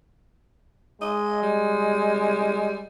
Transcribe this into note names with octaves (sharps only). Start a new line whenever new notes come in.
G#3 D#5
G3